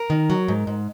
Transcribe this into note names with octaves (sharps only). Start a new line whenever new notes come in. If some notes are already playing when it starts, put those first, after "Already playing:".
Already playing: A#4
D#3
F#3
G#2
G#2